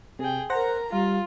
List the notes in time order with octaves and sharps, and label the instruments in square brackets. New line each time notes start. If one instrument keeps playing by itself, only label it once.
[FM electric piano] C3 [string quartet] G#4 G5
[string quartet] A#4 A#5 [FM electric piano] C5 F#5 A#6
[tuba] G3 [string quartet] F4 [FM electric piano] F5